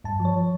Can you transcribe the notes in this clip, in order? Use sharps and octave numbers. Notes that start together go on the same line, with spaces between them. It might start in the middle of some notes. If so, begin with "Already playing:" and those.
G2 A5
F3
C#5